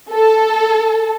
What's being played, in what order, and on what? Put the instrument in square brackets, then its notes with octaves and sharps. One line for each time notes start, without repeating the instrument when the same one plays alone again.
[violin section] A4